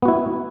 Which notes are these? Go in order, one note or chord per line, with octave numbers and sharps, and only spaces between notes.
B3 E4 F#4